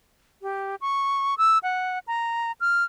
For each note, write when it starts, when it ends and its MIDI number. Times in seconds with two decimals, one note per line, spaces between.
0.42 0.75 67
0.81 1.35 85
1.38 1.58 88
1.63 1.99 78
2.07 2.52 82
2.61 2.84 89